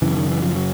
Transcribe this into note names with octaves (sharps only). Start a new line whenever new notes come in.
F#2 C#3 E3
D#3
E3
F3
F#3